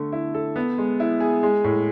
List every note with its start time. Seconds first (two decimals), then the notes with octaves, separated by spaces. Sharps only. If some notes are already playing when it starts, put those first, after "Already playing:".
Already playing: D3 A3
0.12 E4
0.34 A4
0.56 B3
0.78 G#3
1.00 E4
1.20 G#4
1.43 G#3
1.64 A2